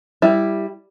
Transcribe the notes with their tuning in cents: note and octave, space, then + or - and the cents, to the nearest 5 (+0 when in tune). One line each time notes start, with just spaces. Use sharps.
G3 +5 E4 +0